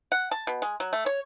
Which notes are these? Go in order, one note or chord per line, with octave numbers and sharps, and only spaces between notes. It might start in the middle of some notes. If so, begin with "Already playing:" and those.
F#5
A5
B2
G#3
F#3
A3
C#5